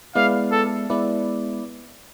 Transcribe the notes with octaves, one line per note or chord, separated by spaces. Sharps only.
G#3 B3 E4 B4 D5 F5
A4
G#3 B3 E4 B4 D5